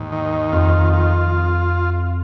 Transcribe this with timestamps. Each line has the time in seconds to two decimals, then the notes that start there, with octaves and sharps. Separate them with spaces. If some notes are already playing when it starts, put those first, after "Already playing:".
Already playing: D#2 G#2
0.12 D#3
0.52 F2 F4
0.93 F4